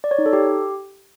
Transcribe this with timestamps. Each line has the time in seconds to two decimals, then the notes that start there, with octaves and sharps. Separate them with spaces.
0.04 D5
0.11 C#5
0.18 D#4
0.26 A4
0.33 G4